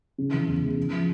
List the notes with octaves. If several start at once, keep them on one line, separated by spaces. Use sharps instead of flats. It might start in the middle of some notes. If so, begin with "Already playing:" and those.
C#3
E3
E2
G#3
C#3
F3